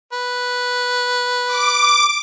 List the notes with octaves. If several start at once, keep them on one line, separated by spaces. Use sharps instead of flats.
B4
D6